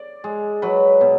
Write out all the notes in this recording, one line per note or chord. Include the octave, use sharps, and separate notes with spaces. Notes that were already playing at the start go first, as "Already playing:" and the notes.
Already playing: D5
G#3
F#3 B4
B2